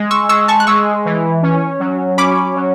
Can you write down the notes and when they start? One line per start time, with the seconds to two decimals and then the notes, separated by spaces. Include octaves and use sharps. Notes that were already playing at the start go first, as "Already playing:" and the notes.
Already playing: G#3
0.11 C#6 E6
0.29 G#3 C#6 E6
0.48 A5 C#6
0.60 F#6
0.67 G#3 C#6 E6
1.05 E3
1.43 C#4
1.80 F#3
2.17 C#4 B5 D6
2.56 F#3